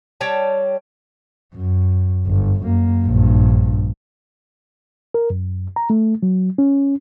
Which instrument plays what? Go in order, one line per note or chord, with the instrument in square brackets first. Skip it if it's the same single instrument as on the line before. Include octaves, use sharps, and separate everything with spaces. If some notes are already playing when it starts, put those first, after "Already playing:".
[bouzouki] G3 C#5 G5 A5
[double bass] F#2
G1
F#2 A#3
A#1 G2
[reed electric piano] A#4
F#2
A#5
A3
F#3
C#4